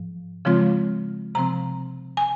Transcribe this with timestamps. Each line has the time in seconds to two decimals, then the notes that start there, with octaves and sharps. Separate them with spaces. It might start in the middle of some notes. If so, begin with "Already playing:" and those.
Already playing: G#2 F3
0.45 C#3 F3 G#3 C4 F4
1.35 C3 F3 C4 A#5
2.17 G#5